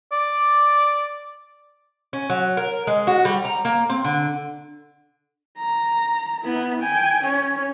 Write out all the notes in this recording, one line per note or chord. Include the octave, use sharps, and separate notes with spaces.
D5
C#4
F#3
A#4
G#3
F#4
G3
A#5
A#3
C4
D3
A#5
B3 E4
G5 G#5
C#4 C#5